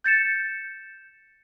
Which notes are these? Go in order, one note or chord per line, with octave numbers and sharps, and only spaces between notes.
G6 A6 C#7 E7